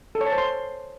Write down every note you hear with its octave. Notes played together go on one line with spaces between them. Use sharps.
A4
C#5
A5
C5
C6